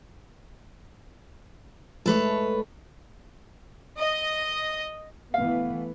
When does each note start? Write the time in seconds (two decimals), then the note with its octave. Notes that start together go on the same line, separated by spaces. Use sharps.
2.06 G#3 A3 A4 B4 C#5
3.97 D#5
5.34 E3 A3 B3 F5